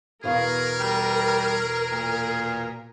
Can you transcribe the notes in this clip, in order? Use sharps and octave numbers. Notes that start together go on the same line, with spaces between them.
E2 B2 G#4 A#4 F5
G3
A#2